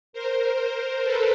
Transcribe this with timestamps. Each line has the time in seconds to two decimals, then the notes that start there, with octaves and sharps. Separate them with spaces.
0.13 A#4 C5
1.04 A4 B4